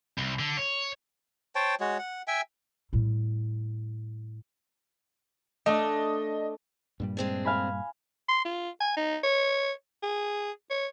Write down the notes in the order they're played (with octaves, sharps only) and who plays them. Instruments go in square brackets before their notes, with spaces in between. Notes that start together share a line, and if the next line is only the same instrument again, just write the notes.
[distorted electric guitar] C2
D3
C#5
[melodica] C5 C#5 G5 A5
G#3 F#4 C#5
F#5
E5 G5 G#5
[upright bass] A2 G3
[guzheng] A3 D4 [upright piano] D#5
[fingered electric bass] G2 A#2 G3
[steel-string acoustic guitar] G#3 C4 D4
[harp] F5 G#5 B5
[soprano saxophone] C6
F4
G#5
D#4
C#5
G#4
C#5